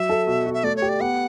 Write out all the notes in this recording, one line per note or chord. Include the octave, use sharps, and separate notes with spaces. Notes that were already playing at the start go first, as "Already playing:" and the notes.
Already playing: F#3 E5
A4
B2
F#4
E5
A3 D5
C#5
G4
D5
B3 F#5